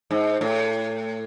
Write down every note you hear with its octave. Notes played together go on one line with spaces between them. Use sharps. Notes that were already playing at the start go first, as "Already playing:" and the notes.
G#2
A2